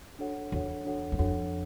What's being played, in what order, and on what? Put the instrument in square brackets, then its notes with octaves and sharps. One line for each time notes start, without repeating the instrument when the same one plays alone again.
[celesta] D4 F#4 A4 C#5 F#5
[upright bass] E2 [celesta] D4 F#4 A4 C#5 F#5
[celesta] D4 F#4 A4 C#5 F#5
[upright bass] F#2
[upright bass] F2 [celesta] D4 F#4 A4 C#5 F#5